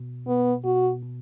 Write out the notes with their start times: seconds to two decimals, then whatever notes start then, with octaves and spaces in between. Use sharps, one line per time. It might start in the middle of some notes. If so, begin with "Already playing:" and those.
Already playing: B2
0.27 B2 B3
0.64 B2 F#4
1.02 B2